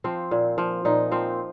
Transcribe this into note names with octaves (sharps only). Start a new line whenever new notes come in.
F3 C4
A#2
F3
A#2 D#4
F3 C4